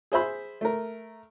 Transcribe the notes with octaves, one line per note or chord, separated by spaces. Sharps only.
G#4 C5 E5 B5
A3 A#4